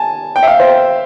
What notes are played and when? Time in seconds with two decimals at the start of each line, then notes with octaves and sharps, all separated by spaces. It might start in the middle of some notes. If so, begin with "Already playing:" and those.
Already playing: G#5 A5
0.36 G5
0.43 E5
0.47 F5
0.60 C5